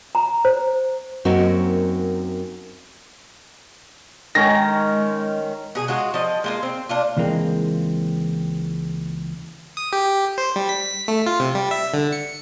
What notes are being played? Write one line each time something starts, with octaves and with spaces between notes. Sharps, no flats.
A#5
C5
F#2 A#3 C4 D#4 F#4 A#4
D#3 G#3 C#4 A#6
B2 G#4
G#3 F4 F#4 G#4
F3 D#5
G#3 A#3 F4
C4
A#3 D4 F4
C#2 E3 G#3 A#3 C4
D#6
G4
C5
G3
B6
A3
F4
C3
G3
E5
D3
C#7